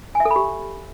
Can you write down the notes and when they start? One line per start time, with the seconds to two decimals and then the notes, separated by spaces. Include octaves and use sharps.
0.15 G#5
0.20 E5
0.25 A4
0.31 B5
0.36 G4